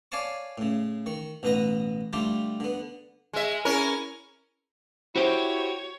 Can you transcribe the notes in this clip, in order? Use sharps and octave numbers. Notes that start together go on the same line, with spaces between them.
C#5 D5 F5 G#5 A5 C#6
A2 C#3
D#3 C#6
A1 B2 D#4 B4 D#5 A#5
D3 G3 A3 F4 G4
D3 B3
G#3 E5
C#4 E4 A#4
E4 F#4 G4 C5 C#5